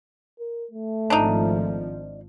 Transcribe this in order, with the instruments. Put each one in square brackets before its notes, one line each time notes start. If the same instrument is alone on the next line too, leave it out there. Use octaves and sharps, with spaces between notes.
[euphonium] A#4
A3
[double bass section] G#1 F3 [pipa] D4 D#4